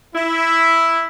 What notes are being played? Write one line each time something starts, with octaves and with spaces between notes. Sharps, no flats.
E4